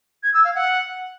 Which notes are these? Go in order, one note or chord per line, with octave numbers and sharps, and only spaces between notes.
G#6
E6
F5
F#5